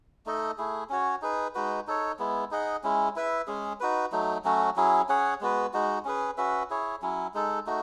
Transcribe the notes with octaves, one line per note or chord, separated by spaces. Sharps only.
A3 D#4 A4 D#5
A3 E4 G#4
C#4 F#4 C#5
D#4 G#4 B4
G#3 D#4 F#4 B4
D#4 A4 C#5
G#3 B3 E4
D#4 G#4 D#5 F#5
G#3 C#4 E4
E4 B4 E5
G#3 C#4 G#4
D#4 F#4 B4
F#3 A3 D#4
F#3 A3 C#4 F#4
F#3 C#4 E4 G#4
C#4 G#4 C#5 F#5
G#3 B3 F#4 B4
G#3 D#4 F#4
C#4 G#4 B4
C#4 F#4 B4 E5
E4 G#4 C#5
F#3 C#4 E4
G#3 D#4 A4
A3 D#4 F#4